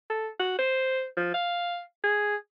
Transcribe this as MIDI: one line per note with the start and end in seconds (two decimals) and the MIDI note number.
0.10 0.28 69
0.39 0.54 66
0.58 1.04 72
1.17 1.31 53
1.34 1.81 77
2.04 2.35 68